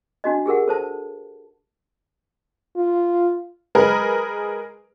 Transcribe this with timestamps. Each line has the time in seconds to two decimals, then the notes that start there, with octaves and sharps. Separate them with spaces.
0.24 D4 F#4 D#5
0.46 G4 G#4 A#4 F#5
0.68 A4 C5 A5
2.77 F4
3.75 G#3 G#4 A#4 B4